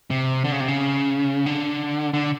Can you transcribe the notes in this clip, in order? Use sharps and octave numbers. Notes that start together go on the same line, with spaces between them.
C3
D3
C#3
C3
C#3
D3
D3